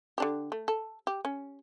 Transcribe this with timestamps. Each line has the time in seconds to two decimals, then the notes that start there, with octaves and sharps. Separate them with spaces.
0.18 D3 D4 G4
0.52 A3
0.68 A4
1.07 G4
1.25 C#4